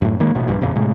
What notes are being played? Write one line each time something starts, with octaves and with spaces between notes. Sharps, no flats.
F#2 A2
D#3 G#3 A#3
A1 B2
A#1 G2 G3
A#1 F2 A#2 C#3
A2 C3 G#3